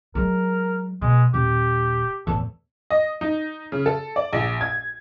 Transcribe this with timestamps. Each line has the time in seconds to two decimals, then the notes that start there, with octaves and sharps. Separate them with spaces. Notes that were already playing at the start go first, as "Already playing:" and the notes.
0.15 F#3 G#3 A#4
1.02 B2 G#3
1.34 D#1 G4
2.27 E2 A2 A4
2.90 D#5
3.21 D#4
3.72 C#3
3.86 A4
4.16 D5
4.33 A#1
4.61 G#6